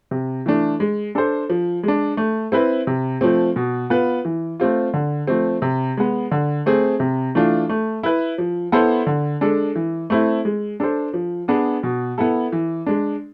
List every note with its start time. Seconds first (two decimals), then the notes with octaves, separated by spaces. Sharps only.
0.11 C3
0.46 E3 A3 D4
0.80 G#3
1.15 D4 A4 C5
1.50 F3
1.83 G#3 D4
2.17 A3
2.52 C4 E4 B4
2.87 C3
3.21 F3 A3 C4
3.56 B2
3.90 B3 F4 B4
4.25 E3
4.60 A3 C4 F4
4.94 D3
5.28 F3 A3 C4
5.62 C3
5.97 G#3 B3
6.32 D3
6.66 A3 C4 G#4
7.00 C3
7.35 E3 A3 D4 F4
7.69 A3
8.03 E4 B4
8.38 F3
8.72 B3 E4 A4 C5
9.07 D3
9.41 G#3 D4 A4
9.76 E3
10.10 A3 C4 E4
10.45 G#3
10.80 D4 A4 C5
11.14 F3
11.48 B3 D4 G#4
11.83 B2
12.18 B3 E4 A4
12.52 E3
12.86 G#3 D4